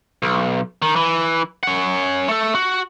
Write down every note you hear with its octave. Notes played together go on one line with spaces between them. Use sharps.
B1
D#3
E3
C#4 F#5
A3 A4
F#4